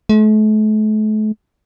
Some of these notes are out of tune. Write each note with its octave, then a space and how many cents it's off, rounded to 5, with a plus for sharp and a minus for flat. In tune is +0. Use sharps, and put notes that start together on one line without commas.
A3 -40